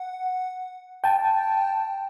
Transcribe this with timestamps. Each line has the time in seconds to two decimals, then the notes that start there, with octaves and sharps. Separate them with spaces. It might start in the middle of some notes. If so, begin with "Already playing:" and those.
Already playing: F#5
1.04 G5 A5